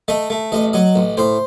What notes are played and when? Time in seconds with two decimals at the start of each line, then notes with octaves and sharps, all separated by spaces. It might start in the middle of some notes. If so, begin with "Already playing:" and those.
0.08 A3 D#5
0.30 A3
0.52 A1 D#5
0.73 F#3 D#5
0.96 A1
1.17 A2 C5